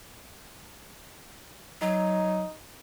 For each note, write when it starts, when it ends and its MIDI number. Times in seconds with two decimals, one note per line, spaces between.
1.81 2.43 54
1.81 2.53 63